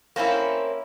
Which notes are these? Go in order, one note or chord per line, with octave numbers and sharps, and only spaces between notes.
A#3 C4 C#4 E4